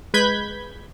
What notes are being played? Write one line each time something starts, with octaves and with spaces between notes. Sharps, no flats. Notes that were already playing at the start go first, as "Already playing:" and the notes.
G#3 B4 B5 G6 G#6 B6